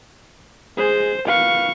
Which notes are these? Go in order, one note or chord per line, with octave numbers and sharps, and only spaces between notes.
G#3 G#4 C5
A#2 B4 F5 C#6